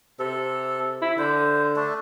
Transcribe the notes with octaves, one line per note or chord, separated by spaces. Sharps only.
C3 A4
E4
D3 C5
A3 D4